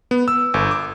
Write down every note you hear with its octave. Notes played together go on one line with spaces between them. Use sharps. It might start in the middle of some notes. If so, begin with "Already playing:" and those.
B3
E6
G1
D6